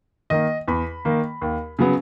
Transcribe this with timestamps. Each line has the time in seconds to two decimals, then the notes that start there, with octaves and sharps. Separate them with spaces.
0.30 D#3 A#3 D#5
0.68 E2 B5
1.05 D#3 A#3
1.41 D#2
1.79 C#3 F#3 B3